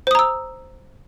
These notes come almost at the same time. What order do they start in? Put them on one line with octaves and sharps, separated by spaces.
C5 D#6 A#5 E6